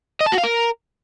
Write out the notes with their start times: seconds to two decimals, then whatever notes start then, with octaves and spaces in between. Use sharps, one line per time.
0.21 D#5
0.26 A5
0.32 F#4
0.38 F5
0.44 A#4